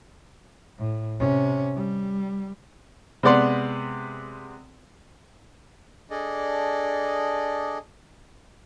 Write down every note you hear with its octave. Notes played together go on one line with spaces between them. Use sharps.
A2
C3 C#4
G3
C3 G#3 B3 D5 F#5 C6
D4 G#4 A4 D5 D#5